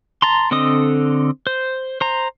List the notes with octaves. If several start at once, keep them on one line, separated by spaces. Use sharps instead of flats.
A5 A#5 C6
D3 C4 A4 D#5 D#6
C5
C5 A#5